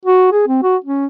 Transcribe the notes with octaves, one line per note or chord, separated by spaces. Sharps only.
F#4
G#4
C4
F#4
C#4